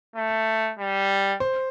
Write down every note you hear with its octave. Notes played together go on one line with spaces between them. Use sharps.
A3
G3
C5